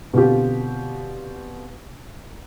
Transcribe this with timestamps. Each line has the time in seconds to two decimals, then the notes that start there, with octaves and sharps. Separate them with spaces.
0.13 B2 D3 C4 F4 G4